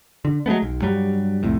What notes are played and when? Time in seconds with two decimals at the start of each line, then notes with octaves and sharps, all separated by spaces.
0.25 D3
0.46 F#3 G#3 A3 B3
0.63 B1
0.82 G2 F#3 G3
1.43 C2 F2 A2